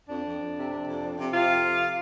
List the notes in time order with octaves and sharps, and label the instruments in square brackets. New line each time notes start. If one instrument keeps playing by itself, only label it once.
[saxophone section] F2 D4
F2
F2
C3
C3
F2
F3
C3
C3 F4
F2
C3